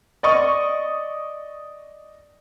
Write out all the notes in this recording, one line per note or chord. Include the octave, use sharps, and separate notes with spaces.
D5 D#5 C#6 D#6